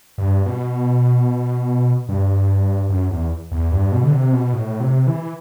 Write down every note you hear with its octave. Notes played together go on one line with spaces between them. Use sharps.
G2
B2
G2
F#2
E2
E2
G2
B2
D3
C3
B2
A2
C3
E3